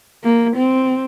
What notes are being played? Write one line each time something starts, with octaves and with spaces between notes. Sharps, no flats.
A#3
C4